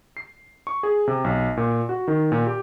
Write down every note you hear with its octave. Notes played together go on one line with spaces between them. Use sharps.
C7
C#6
G#4
C3
B1
A#2
F#4
D#3
A#2
G4